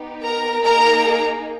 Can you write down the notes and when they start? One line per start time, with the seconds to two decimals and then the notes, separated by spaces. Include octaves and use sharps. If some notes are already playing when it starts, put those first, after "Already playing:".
Already playing: B3 D#4 G4
0.24 A#4 A#5
0.64 A#3 D#4 G#4 A#4 A#5